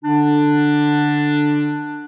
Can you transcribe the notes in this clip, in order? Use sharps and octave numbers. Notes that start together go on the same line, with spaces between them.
D3 D4